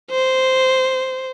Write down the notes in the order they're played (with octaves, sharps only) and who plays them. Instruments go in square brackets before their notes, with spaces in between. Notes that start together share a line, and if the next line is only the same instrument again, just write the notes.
[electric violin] C5